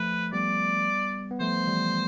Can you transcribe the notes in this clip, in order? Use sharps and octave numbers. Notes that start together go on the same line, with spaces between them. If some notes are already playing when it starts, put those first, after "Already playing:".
Already playing: F3 A3 B4
G3 B3 D5
B3
F3 A3 C5
E3 G3